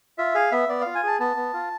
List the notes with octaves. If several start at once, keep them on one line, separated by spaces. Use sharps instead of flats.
F4 E5
G#4 F5
B3 E5
B3 D5
F4 F5
G#5
G#4 A5
B3 A5
B3
F4